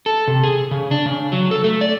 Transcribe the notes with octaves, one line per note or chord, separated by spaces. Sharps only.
A4
C3
G#4
C#3
D4
C#3
F#3
A4
A3
D5